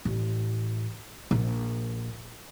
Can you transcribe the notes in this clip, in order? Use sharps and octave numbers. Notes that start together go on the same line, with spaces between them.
A1
A#1